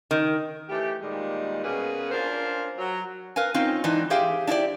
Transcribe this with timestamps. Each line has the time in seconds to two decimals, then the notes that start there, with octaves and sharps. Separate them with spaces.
0.11 D#3
0.69 E3 A3 G4
1.02 A#2 D#3 G3 G#3
1.64 B2 A#3 C#4 G#4 B4
2.12 C#4 D4 F4 A#4 C5
2.78 F#3
3.36 A#4 B4 F5 G#5
3.54 C4 C#4 D#4 F4
3.84 G#2 E3 D4 D#4
4.10 G4 G#4 C5 E5 F5 G5
4.47 D4 E4 F4 G4 D5